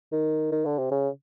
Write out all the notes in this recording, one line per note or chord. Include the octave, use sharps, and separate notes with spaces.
D#3
D#3
D3
C3
C#3